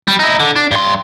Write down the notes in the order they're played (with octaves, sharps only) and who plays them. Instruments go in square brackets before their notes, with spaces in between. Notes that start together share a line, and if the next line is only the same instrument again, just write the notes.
[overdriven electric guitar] G3
D#4 E4
D3
D4
G2 C6